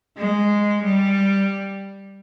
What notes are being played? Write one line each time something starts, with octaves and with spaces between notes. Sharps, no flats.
G#3
G3